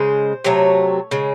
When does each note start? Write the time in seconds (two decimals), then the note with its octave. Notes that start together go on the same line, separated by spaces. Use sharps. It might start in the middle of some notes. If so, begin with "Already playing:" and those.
Already playing: C#3 G#3 C5
0.44 C3 F#3 A3 C#5
1.11 C#3 G#3